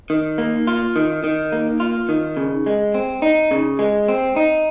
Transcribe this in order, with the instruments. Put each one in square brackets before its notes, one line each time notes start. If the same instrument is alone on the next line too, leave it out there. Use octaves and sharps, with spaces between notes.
[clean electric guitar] D#3
A#3
F4
D#3
D#3
A#3
F4
D#3
C#3
G#3
C4
D#4
C#3
G#3
C4
D#4